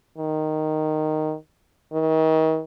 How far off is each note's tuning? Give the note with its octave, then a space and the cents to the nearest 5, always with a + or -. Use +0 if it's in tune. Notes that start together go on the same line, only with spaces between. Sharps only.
D#3 -5
D#3 +35